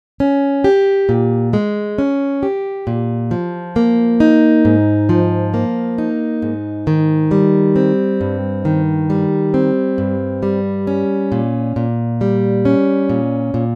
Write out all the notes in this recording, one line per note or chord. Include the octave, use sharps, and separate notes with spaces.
C#4
G4
A#2
G#3
C#4
G4
A#2
F3
A#3
D#4
G#2
F3
A#3
D#4
G#2
D#3
G3
C4
G2
D#3
G3
C4
G2
G3
C#4
A#2
A#2
G3
C#4
A#2
A#2